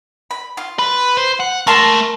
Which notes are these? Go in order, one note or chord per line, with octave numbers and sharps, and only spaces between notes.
B5
F4
B4
C5
F#5
G#3 A3 A#4 A5 C6